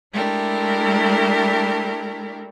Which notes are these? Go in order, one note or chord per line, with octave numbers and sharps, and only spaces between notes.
G#3 A3 D4 E4 G4 A#4